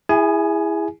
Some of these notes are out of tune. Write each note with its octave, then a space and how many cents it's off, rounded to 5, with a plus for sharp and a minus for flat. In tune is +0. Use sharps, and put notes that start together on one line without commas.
E4 +0 G#4 -20 G#5 +15